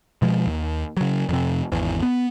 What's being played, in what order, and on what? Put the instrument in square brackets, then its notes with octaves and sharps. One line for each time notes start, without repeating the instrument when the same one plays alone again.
[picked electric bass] B2 F3 G#3
D#2
C#3 F#3
F2 C3
G#1 E2 E3
B3